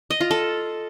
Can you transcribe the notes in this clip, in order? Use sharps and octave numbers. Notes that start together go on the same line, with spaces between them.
D#5
F4
A4